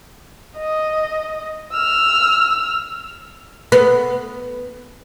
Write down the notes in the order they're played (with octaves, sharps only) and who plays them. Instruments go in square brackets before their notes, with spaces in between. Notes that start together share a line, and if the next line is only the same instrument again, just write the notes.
[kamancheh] D#5
E6 F6
[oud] B3